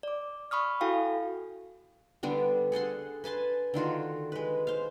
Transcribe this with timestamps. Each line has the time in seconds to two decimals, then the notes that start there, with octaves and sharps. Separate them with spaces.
0.03 D5 D6
0.51 B5 C#6 D#6 F6
0.81 E4 F#4 A4 F5 G5 G#5
2.23 D3 G3 B3 D4
2.72 G#4 A4 F#5 C6
3.24 B4 G#5 A5 C6
3.74 D3 D#3 F4 F#4
4.32 G#3 B4
4.67 C5 F5